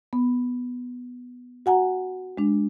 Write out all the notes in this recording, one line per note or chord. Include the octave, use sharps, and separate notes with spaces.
B3
F#4 F#5 G#5 A#5
G#3 D4